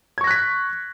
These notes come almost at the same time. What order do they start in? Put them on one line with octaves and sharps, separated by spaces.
G#6 C#6 A#6 F#6 B6